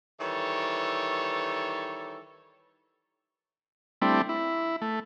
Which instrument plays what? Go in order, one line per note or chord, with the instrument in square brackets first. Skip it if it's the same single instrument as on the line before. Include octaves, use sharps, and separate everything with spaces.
[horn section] D#3 E3 G3 A4 C#5
[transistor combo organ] G3 A3 C4 D4 E4
E4
A3